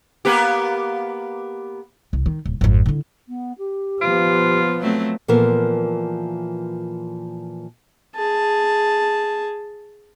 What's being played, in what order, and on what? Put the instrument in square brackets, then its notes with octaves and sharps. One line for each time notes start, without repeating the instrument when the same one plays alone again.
[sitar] A#3 B3 G4
[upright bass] C2
D#3
D#1
G#1 F2
D3 E4
[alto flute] B3
G4
[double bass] F3 B3 [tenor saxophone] F4
[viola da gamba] F#3 A3 C4
[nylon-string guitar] A#2 E3 F3 B3 A4 A#4
[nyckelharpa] G#4 A5